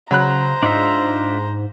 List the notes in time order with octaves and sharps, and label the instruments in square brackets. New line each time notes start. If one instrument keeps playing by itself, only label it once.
[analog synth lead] C#3 [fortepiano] F#3 B5 F#6 [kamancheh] C5 A#5
[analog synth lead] G#2 [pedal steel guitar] D4 F4 E5 [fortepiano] D#4